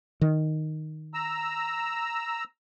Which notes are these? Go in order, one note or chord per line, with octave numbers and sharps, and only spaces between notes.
D#3
A#5 E6